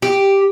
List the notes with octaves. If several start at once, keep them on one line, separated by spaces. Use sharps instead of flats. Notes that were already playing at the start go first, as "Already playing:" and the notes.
G4